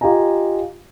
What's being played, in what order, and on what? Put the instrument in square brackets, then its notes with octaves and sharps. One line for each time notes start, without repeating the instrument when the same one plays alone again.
[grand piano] F4 G4 D#5 G#5 A#5